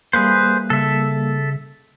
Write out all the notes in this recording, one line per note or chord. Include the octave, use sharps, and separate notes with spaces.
G3 A#3 G#4 B4 C5
C#3 A4 E5